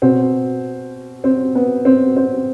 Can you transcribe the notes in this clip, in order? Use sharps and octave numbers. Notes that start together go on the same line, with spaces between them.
B2 C4
C4
B3
C4
C4